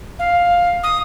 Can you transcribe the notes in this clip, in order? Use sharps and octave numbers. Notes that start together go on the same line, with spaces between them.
F5
D#6